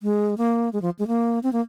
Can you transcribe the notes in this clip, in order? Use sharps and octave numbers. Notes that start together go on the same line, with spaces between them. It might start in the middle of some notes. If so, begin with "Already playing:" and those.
G#3
A#3
G#3
F3
G#3
A#3
C4
A#3